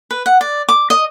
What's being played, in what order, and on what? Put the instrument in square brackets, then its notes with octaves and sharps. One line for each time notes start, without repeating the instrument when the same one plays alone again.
[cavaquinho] B4
F#5
D5
D6
D#5